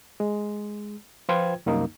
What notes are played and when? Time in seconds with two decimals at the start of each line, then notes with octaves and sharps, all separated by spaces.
0.20 G#3
1.29 F3 F4 B4 C5 G5 G#6
1.66 C2 F#2 A#3 D#4